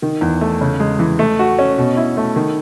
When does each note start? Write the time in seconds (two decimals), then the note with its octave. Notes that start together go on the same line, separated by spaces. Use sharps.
0.02 D#3
0.21 E2
0.41 A3
0.61 C#3
0.80 G#3
0.99 E3
1.19 A3
1.39 F#4
1.59 C#4
1.78 B2
1.97 E4
2.17 A3
2.36 D#3